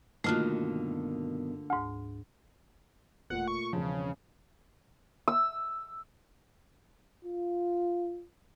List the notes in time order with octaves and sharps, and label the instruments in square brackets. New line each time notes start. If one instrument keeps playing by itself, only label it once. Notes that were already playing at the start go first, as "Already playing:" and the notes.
[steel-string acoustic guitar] G2 B2 D#3 [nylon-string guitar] D3 A#3 [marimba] A3 F4 F#4
[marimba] D2 G#2
[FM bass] E1 [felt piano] A#2 A3 [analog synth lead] F#5
[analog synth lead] C#6
[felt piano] E1 C4 A5 [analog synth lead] C#3 [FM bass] F3
[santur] E6
[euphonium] F4